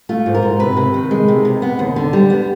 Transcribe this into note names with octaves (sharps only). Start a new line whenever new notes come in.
A3 F4
G#2
A#4
G#2
C3 B4
C3
D#3
G#3
C3
C3
B3
D#2
D3
G3
B3